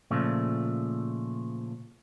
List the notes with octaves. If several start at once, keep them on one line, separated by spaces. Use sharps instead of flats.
A#2 C#3 F3 A3